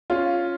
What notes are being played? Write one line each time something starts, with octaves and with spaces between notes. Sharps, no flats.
C#4 F4